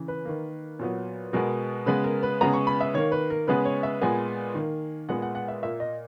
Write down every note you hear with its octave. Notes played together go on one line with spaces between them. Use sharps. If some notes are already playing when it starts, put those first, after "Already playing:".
Already playing: C#3 E3
B4
D#3 A#3
A#2 F#3 B3
B2 G#3 B3 A#4
C#3 G#3 B3 B4
A#4
B4
C#3 G#3 B3 A#5
C#6
B5
E5
D#3 A#3 C#5
B4
A#4
C#3 G#3 B3 B4
C#5
E5
A#2 G#3 B3 G#5
D#3 A#3
A#2 G#3 B3 F#5
F#5
F#5
E5
A#2 A#3 E5
D#5